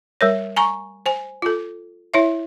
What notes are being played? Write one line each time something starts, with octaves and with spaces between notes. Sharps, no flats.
G3 A#4 C#5
G#5 A#5 C#6
C5 G#5
F4 A4
E4 C#5 E5